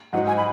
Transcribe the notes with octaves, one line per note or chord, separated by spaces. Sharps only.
G#2 F#3 D#4 F#5
G#5
B5